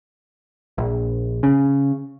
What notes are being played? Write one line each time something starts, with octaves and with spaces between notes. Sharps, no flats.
A#1
C#3